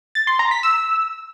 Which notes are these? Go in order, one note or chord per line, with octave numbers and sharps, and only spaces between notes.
A6
C6
A#5
B6
E6